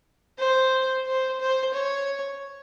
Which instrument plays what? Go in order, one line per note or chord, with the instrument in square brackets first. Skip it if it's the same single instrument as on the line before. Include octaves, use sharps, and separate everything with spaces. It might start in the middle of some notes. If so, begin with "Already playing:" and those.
[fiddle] C5
C5
C5
C#5